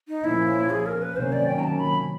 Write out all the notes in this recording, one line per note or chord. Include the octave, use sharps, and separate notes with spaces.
D#4
A#2 F3 A#3 C#4 E4
G#4
A#4
B4
C3 D#3 F#3 A#3 C#4 C5
D5
G5
A#5
A5
B5